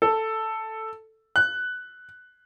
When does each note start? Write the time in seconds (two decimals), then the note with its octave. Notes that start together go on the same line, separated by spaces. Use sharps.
0.02 A4
1.36 F#6